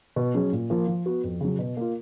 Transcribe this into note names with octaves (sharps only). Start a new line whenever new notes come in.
B2
F#3 C#4 G#4
A#2
F3 A#3
F3
B3 F#4
F2
C#3 F#3
B2
A#3 F4